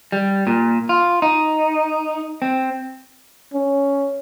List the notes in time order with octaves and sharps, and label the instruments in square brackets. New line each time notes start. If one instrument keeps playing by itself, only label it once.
[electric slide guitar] G3
A#2
F4
D#4
C4
[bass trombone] C#4